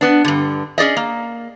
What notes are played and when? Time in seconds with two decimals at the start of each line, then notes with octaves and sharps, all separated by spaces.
0.01 B3 D4
0.25 G2 D3
0.78 C#4 G#4 D5 D#5
0.97 A#3